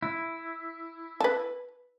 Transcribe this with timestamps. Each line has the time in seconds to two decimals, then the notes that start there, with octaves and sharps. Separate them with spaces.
0.02 E4
1.21 B4 A5